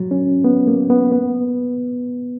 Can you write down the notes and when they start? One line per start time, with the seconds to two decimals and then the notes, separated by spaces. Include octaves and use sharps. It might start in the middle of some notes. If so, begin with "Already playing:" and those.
Already playing: F#3
0.11 C#4
0.44 B3
0.68 A#3
0.90 B3
1.12 B3